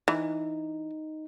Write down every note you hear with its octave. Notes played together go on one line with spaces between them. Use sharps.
E3 D#4